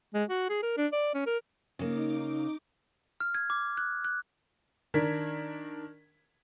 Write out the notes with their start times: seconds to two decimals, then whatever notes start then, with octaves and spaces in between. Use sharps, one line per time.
0.14 G#3
0.29 F#4
0.49 G#4
0.63 A#4
0.77 D4
0.92 D5
1.14 C#4
1.26 A#4
1.79 C#3 A#3 D#4 D6
3.20 F6
3.35 G#6
3.50 D6
3.77 F#6
4.05 F#6
4.94 D#3 D4 A#4 G#6 B6